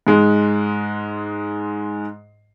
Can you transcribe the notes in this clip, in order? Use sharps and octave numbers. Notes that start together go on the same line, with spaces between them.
G#2 G#3